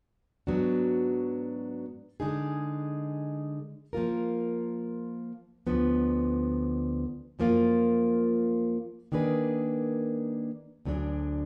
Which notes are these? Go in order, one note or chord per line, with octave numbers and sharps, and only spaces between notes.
G#2 F#3 B3 D4 F#4
D3 G#3 D#4 G#4
F3 A#3 F4 A#4
D2 D3 F3 B3
F#2 F3 A#3 F4
D#3 A#3 D4 G#4 B4
D2 D3 F#3 D4 G#4